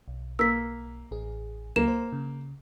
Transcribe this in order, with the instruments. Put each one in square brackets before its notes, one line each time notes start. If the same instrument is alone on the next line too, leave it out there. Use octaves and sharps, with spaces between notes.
[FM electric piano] B1
[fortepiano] A#3 [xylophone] E6 B6
[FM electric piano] A1 G#4
[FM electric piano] C#2 F#3 [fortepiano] A#3 [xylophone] E7
[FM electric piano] C5
C#3